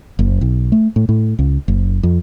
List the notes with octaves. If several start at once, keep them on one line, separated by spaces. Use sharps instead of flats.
F#1
B1
A3
A2
A2
C#2
F#1
F2